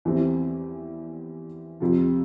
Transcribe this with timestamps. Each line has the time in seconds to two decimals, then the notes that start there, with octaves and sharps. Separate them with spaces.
0.05 E2 E3 G3 C4 E4
1.80 F2 C3 F3